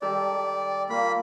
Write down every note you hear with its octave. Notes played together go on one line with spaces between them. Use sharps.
D#3 G3 A4 D5
A#3 F4 B5